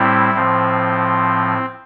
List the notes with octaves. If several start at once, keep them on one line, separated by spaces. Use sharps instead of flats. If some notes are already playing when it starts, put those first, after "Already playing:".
Already playing: A2 G3 C4 E4
A2 F3 C4